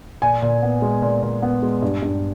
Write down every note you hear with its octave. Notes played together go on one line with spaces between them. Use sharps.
A#2 G#5
A#2
B3
G#3
A#2
A#2
B3
G#3
G2
G2